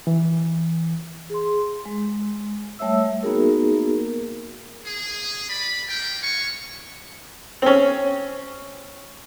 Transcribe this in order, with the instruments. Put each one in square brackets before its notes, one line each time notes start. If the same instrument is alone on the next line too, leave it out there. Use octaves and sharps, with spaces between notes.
[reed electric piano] E3
[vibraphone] G#4 C6
G#3
G3 A3 C#5 E5 E6
A#3 B3 D#4 F#4 G#4 A#4
[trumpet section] G#4
D5 B5
G3 A#3 A#4 G5
F4 F#4 F5 G#5 C#6
[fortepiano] C4 C#4